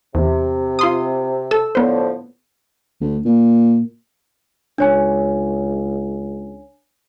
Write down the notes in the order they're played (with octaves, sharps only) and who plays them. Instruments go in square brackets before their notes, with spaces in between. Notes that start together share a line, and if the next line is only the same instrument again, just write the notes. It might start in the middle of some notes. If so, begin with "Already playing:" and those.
[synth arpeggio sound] E2 [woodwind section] C3
[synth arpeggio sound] F4 C6 D#6
A4 E6
[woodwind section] A2 D3 F3 [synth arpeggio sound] B3 C5
[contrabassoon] D2
A#2
[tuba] C#2 [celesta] D4 C#5 G#5